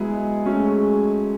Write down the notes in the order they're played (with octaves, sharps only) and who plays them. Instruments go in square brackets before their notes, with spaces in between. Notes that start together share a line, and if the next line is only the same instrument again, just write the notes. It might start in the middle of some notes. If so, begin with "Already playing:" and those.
Already playing: [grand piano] F#3 B3 E4 G#4 B4 [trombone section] G#3
[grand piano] F#3 A3 C#4